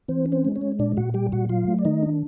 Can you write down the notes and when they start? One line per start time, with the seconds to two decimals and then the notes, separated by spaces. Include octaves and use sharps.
0.08 E3 C4 C5
0.26 C#4
0.32 C4 C5
0.45 G#3
0.56 C#4 C#5
0.61 G#3
0.79 A#2 D4 D5
0.97 A#2 F#4 F#5
1.14 G3 G4 G5
1.32 A#2 F#4 F#5
1.49 F#3 F4 F5
1.68 A3
1.79 D5
1.85 D#3 D#4 D#5
2.03 D4